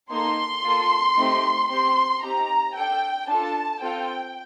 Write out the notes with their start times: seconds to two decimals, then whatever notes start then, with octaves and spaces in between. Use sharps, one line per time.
0.11 A#3 D#4 A4 C6
0.64 A#3 F4 A4
1.17 A3 C4 D#4 G4
1.70 C4 G4 C6
2.22 C4 D#4 G4 A#5
2.75 D4 A4 G5
3.28 D4 F4 A4 A5
3.81 C4 F4 A4 G5